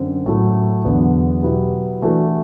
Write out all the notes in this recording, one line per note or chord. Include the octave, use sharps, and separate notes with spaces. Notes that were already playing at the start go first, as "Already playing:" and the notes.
Already playing: F#2 D3 C4
A2 F#3 A3
E2 D3 F#3 B3
B2 F#3 B3 E4 G4
E3 A3 D4 F#4 A4